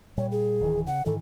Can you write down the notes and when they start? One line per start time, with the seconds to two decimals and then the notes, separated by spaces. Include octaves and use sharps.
0.17 A#2 G3 C#5
0.32 G#4
0.61 D1 D#3 E3
0.87 C#3 F#5
1.06 G#2 D#3 E3 A4